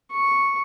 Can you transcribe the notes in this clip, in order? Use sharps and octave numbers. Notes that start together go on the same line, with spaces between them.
C#6